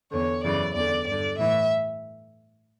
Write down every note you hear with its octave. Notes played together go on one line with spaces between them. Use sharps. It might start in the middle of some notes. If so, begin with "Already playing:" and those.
E2 D3 C#5
F#2 C#3 E3 D5
E2 D3 D5
G2 D3 D5
A2 E3 E5